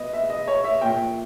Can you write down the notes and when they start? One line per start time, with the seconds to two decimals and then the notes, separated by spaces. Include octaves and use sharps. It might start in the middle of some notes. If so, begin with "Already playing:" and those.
Already playing: B2 B4 D#5
0.13 E5
0.30 D#5
0.48 C#5
0.64 E5
0.81 A#2 G5